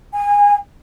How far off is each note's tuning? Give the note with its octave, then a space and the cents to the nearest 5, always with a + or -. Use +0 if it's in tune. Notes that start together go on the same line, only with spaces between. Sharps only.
G#5 -25